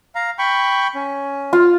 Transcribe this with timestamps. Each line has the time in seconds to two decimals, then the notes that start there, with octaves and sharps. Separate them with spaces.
0.15 F5 A#5
0.39 G5 B5 C#6
0.95 C#4
1.53 F4